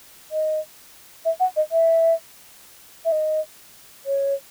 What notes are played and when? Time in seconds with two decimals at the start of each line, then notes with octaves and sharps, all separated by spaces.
0.31 D#5
1.25 E5
1.40 F#5
1.56 D#5
1.72 E5
3.05 E5
3.12 D#5
4.06 C#5